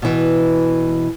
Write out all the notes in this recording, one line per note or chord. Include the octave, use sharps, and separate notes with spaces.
B2 E3